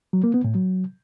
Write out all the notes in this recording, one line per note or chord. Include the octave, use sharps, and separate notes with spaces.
F#3
A#3
B3
A2
F#3